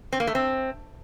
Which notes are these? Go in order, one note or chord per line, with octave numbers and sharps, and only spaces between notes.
C4
A#3
A3
C4